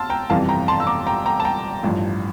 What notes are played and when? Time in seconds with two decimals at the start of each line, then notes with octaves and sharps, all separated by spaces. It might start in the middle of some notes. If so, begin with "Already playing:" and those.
Already playing: A5 C6 E6 F6 A6
0.10 G5 A#5
0.29 G1 F2 C3 E3 G3 F5 A5
0.49 G5 A#5
0.68 A5 C6
0.80 E6
0.87 A#5 D6
1.07 G5 A#5
1.26 G5 A#5
1.40 A5
1.45 G5 A#5
1.83 A1 G2 F3